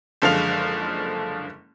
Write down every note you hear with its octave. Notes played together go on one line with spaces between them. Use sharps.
F#1 D3 F3 G#3 F5 F7